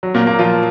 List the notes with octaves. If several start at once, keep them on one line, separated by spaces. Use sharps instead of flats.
F#3
A#2 A#3
A#2 A#3
F3 F4